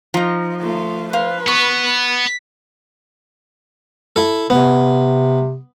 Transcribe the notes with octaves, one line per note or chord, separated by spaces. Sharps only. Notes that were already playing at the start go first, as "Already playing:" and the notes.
F3 D#4 A#5
A3 F4
B4 C5 F5
B3 C#6
E4 A4
C3 B3